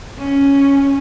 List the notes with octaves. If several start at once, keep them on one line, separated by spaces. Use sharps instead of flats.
C#4